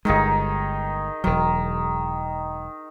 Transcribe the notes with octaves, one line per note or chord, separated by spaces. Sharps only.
G1 D#3 G#3 D#4 G#4
E1 D#3 F#3